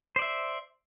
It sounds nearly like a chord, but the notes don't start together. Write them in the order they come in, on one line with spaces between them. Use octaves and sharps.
C5 D5 E5